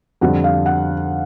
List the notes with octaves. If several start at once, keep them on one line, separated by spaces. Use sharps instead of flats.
F2 D3 G3 F#5
F5
F#5